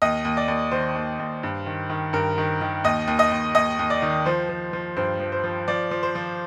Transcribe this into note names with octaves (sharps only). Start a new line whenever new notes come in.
D#2 D#5
D#2
D5
D#2
D#3 C5
D#2
D#2
G2
D#3
D#3
G2 A#4
D#3
D#3
D#2 D#5
D#2
D#5
D#2
D#2 D#5
D#2
D5
D#3
F3 C5
F3
F3
G2 C5
F3
C5
F3
F3 D5
F3
C5
F3